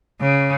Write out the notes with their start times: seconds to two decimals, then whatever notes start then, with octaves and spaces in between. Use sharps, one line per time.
0.20 C#3